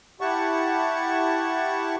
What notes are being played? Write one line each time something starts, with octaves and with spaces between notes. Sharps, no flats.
E4 G4 F#5 A5 C#6